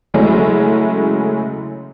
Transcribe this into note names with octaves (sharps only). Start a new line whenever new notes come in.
C#3 E3 F#3 G#3 A3 C#4